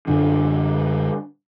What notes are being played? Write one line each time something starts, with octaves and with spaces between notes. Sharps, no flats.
F#2 D3 D4